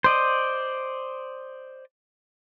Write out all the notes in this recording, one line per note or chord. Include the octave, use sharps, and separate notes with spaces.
C5 D5 D#5